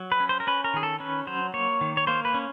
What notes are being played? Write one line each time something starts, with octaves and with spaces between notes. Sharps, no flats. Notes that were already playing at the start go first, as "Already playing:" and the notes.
Already playing: F#3
B4
C#4
C5
A#4
C#4 B4
A#4
D#3 G#4
A4
C#4 B4
F#3 C5
A#3 C#5
D#3
C#5
A#3 C5
B4
C#4